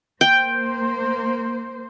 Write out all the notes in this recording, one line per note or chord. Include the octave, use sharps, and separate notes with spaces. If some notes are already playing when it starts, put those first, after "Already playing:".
A#3 C5 G5